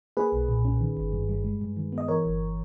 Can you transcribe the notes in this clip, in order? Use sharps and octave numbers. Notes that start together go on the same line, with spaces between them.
A#3 G#4 B4
B1
A#2
C#4
D#3
G1
G2
G3
G#3
G2
D#3
B3
D#5
E3 A#4 C#5
G1